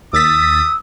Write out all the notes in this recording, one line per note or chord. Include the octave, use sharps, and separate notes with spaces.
D#2 D#6 E6 A6 B6